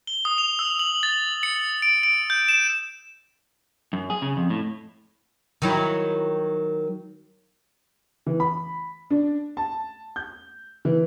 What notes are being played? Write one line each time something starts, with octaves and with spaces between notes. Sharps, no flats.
G7
D#6
F7
E6
F#7
A6
C#7
D7
D7
G6
E7
F#2
G#4
C#3
F2
A2
D#3 F#3 E4
E3
B5
D4
A5
G6
E3